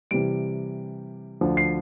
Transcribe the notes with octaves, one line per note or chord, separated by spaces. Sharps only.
C3 E3 G3 D7
D2 D3 F3
C7